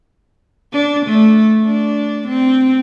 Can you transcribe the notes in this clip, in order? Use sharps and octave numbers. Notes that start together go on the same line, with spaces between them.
D4
A3
D4
C4